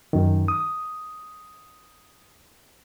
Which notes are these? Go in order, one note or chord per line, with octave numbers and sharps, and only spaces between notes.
F#2 D#3
D#6